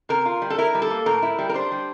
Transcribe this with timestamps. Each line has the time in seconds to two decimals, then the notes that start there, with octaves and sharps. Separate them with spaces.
0.09 C3 A#4
0.26 F4
0.42 G3
0.50 A4
0.58 E4 A#4
0.75 G3
0.82 A4
0.90 A#3
1.06 A2 A#4
1.23 E4
1.39 G3
1.49 A#4
1.54 D4 C5
1.72 G3